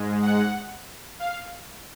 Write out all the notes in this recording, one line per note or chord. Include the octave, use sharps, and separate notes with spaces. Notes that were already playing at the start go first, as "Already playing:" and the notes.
Already playing: G#2 G#3
F#5
F5